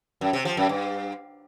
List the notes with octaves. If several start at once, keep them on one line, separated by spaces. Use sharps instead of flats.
F#2
C3
F3
F#2
G2